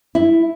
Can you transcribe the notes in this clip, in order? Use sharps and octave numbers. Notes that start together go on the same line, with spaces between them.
E4